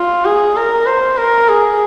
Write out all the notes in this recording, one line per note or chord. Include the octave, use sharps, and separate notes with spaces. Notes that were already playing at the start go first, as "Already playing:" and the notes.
Already playing: F4
G#4
A#4
C5
A#4
G#4